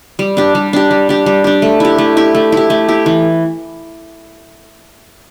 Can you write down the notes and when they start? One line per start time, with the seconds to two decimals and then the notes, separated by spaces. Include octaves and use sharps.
0.19 G3
0.37 D4 G4
0.55 G3
0.73 D4 G4
0.91 G3
1.09 D4 G4
1.26 G3
1.44 D4 G4
1.62 A3
1.80 E4 G4
1.98 A3
2.17 E4 G4
2.35 A3
2.52 E4 G4
2.70 A3
2.89 E4 G4
3.06 E3